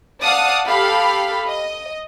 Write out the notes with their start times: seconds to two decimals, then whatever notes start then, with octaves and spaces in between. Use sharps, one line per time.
0.23 D5 F5 F#5 A5 D#6
0.66 G4 A4 F5 B5
1.47 D#5